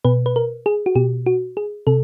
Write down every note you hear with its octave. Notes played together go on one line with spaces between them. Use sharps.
B2 B4
B4
A#4
G#4
F#4
B2 G4
F#4
G#4
C3 A4